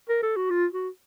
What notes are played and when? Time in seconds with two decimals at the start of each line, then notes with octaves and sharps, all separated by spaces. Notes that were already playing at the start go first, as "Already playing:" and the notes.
0.09 A#4
0.22 A4
0.36 F#4
0.50 F4
0.73 F#4